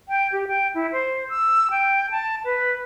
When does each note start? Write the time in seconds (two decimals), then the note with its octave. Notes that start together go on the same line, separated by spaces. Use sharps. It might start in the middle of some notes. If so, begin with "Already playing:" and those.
0.09 G5
0.32 G4
0.48 G5
0.75 E4
0.92 C5
1.29 E6
1.71 G5
2.11 A5
2.45 B4